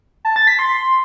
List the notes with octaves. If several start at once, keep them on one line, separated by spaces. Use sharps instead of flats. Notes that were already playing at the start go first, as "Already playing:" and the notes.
A5
A6
B6
C6